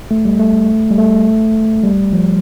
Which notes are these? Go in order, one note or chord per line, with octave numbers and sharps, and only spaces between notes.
A3
G3
A3
G3
A3
G3
F3